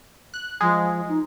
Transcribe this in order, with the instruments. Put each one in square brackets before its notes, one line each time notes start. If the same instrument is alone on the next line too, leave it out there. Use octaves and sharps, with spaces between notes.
[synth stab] F#6
[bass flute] F3 [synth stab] G#3
[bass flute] D#4